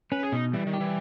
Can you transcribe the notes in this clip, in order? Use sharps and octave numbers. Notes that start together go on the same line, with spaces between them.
C#4 B4
G#4
B2 D#4
E3 G3
D#3
G4
E3